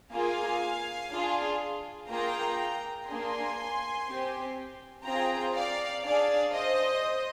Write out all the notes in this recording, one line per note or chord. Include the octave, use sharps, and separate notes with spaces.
A#3 F4 G#4 F5 G#5
D4 F4 G#4
A#3 F4 G#4 G5 A#5
A#3 D4 G#4 G#5 C6
C4 G4
C4 F4 G#4 G5 A#5
D5 F5
D4 G#4 D5 F5
C5 D#5